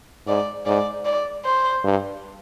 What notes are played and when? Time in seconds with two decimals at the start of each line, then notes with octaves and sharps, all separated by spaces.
0.27 G#2 D5
0.66 G#2 D5
1.05 D5
1.45 C5
1.84 G2